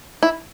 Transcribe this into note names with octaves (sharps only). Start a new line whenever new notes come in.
E4